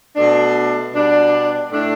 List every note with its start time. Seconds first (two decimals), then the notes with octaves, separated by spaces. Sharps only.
0.16 B2 A3 D4
0.93 B2 G3 D4
1.70 A2 A3 D4